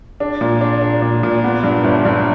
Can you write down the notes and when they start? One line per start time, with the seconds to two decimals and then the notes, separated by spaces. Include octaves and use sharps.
0.20 D4
0.41 A#2
0.61 D4
0.82 D4
1.02 A#2
1.23 A#2
1.44 B3
1.63 G2
1.84 G1
2.05 G2